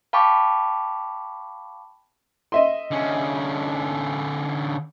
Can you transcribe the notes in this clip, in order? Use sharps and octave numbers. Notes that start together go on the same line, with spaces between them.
F5 G5 A5 B5 C#6 D6
D#5 E5 C6
D3 C#4